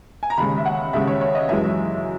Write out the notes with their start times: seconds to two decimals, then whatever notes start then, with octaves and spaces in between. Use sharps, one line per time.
0.23 G#5
0.30 A#5
0.38 D#2 C#3 G#3 B5
0.58 E5
0.65 F#5
0.93 D#2 C#3 G#3 E5
1.07 C#5
1.21 C#5
1.35 D#5
1.49 F#2 E3 G#3 E5